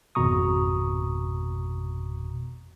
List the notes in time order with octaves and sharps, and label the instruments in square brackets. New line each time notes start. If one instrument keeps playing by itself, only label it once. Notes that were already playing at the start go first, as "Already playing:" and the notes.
[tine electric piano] G#1 F2 B2 A#5 C#6 D#6